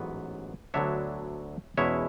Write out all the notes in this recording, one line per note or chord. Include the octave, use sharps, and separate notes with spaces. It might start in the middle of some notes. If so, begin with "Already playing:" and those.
Already playing: A1 G#2 F#3 B3 B4
D2 D3 F#3 B3 D4 C#5 E5
E2 B2 G#3 C#4 E4 C#5 E5